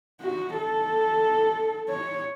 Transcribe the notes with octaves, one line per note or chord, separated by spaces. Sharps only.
F#4
A4
C#5